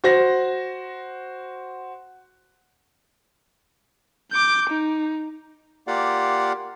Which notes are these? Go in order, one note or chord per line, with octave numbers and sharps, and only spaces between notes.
F#4 C5 A#6
D6 G6
D#4
A#3 F4 G4 D5 F5 F#5